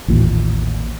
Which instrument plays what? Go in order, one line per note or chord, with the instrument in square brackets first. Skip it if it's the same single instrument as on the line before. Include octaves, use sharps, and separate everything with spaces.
[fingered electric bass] A1 D#2 A#2